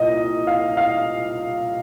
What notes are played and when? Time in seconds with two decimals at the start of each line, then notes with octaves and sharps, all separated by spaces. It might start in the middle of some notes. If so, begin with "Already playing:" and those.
Already playing: C2 A#2 D#5
0.47 F5
0.77 F5